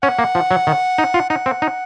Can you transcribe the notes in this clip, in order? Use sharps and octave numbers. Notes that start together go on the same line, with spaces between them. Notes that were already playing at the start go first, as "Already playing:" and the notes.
C#4 F#5
A#3
F3
F#3
D#3
D#4
F4
D#4 F#5
C4
D#4